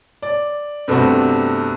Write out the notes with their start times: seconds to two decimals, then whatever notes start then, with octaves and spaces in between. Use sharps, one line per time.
0.22 D5
0.88 G2 C3 A3 B3 C4 F#4